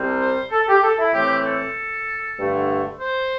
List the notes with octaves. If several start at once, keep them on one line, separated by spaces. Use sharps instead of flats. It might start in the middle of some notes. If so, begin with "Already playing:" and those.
Already playing: C2 C3 G3 C4
C5
A4
G4
A4
E4
A2 E3 A3 C4 G4
A4
G2 D3 A3
C5